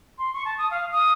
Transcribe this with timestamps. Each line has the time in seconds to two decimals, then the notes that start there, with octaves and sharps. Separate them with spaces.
0.18 C6
0.34 C#6
0.45 A5
0.58 D#6
0.71 F5
0.92 D#6